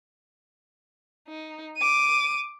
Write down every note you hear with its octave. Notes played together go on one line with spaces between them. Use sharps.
D#4
D6 D#7